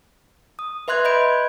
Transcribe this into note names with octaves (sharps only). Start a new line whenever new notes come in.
D#6
B4 E5 C6 F#6 G#6
D#5 B5 G6 G#6 D7